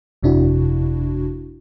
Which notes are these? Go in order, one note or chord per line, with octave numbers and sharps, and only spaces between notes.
G1 F2 C3 D4 E4 F#4